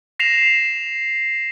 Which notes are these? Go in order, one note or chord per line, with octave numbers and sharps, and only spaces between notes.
A#6 C7 E7 F7